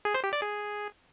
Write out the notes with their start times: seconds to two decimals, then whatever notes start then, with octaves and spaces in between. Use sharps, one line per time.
0.05 G#4
0.14 C5
0.24 G4
0.33 D5
0.42 G#4